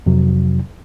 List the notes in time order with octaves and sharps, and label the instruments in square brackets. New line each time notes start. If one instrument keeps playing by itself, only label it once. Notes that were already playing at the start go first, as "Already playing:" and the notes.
[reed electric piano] F2 C3 F#3